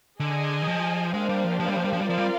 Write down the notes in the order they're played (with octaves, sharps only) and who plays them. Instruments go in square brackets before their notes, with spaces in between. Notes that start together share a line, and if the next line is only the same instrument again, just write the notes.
[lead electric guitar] D3 [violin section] G#4 D#5 G#5
[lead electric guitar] D#3
F3
[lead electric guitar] G#3 [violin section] A#3 D4 G4 C5 F5
[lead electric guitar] G3
F3
F3
G3
F3
G3
F3
G3
[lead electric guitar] F3 [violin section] C4 F4 A#4 D5 F5
[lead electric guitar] G3